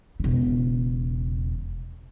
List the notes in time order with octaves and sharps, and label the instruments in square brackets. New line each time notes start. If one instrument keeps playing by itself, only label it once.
[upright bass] E1 C#3